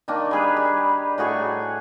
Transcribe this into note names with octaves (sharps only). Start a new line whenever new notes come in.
D#3 A#3 D4
G3 G#4 B4
G4
A2 F#4 G#4 C#6